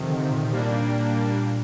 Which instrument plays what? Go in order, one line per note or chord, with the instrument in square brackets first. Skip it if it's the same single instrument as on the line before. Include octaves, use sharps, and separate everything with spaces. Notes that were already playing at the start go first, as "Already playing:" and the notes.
Already playing: [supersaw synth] F2 C3 D#3
[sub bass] D3
A#2
[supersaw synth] G3 A#3 D4